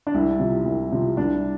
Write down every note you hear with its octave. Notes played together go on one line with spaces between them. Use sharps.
D4
C2 E4
C3 F3
C2
C3 F3
C2 D4